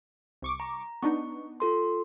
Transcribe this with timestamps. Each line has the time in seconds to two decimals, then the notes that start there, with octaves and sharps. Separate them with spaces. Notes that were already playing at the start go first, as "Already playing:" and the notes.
0.42 C2 C#6 D6
0.60 A#5
1.03 B3 D4 D#4 C#6
1.60 F4 A4 C6